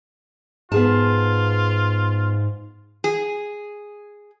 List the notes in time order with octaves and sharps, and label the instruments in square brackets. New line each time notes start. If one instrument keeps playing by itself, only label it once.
[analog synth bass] G#2 [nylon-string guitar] B3 G#4 A5 [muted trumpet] F4
[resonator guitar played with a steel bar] G#4